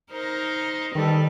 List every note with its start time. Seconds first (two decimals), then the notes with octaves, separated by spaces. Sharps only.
0.12 D#4 A#4 C5
0.95 D#3 G3 A4 B4